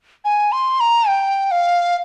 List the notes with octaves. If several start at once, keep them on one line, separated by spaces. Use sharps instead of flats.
G#5
C6
A#5
G5
F5